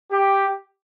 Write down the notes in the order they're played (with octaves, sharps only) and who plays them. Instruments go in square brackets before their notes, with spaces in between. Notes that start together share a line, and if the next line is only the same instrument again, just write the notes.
[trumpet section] G4